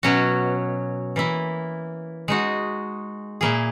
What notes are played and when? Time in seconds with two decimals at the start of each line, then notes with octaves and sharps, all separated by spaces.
0.03 B2 F#3 C#4 F#4
1.16 E3 A#3 E4
2.28 G#3 D#4 F#4
3.41 A#2 A#3 E4 G#4